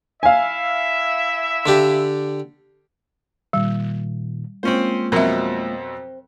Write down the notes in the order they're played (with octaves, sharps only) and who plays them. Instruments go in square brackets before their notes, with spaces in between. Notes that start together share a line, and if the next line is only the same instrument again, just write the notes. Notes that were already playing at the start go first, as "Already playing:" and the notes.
[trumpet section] E4 E5 [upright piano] F5 G#5
[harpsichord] D3 D4 G4
[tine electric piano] A#2 D#3 [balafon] G3
[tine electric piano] G#3 A#3 F4 [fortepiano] C4 C#4 C5
[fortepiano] F2 B2 F#3 [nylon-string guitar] C4 [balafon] A#4 E5